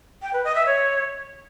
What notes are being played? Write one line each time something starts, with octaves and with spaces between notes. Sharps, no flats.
G5
B4
D#5
E5
C#5